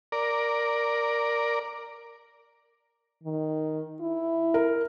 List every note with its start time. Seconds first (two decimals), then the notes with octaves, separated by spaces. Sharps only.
0.12 A#4 D5
3.23 D#3
4.00 E4
4.54 A#4